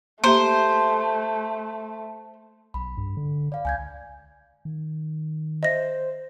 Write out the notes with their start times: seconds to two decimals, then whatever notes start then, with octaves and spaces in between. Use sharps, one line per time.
0.24 A3 A#3 G4 C5 E5
2.74 B1 B5
2.97 G2
3.17 D3
3.52 D5 F5
3.65 C#2 G#5 G6 G#6
4.65 D#3
5.63 C5 D#5 E5 A#6